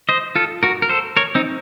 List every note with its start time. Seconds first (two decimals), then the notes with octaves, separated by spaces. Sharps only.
0.09 C5 D#5
0.35 F4 A4
0.63 F#4 A#4
0.82 A#4
0.89 A4 C5
1.17 A#4 C#5
1.35 C4 D#4